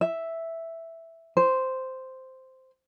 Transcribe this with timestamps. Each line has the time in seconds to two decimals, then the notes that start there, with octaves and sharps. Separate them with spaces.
0.01 E5
1.37 C5